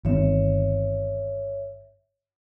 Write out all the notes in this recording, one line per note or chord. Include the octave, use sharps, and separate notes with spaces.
G1 D#3 C4 C#5 E5